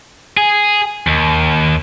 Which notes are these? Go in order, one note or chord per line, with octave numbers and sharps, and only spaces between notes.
G#4
D#2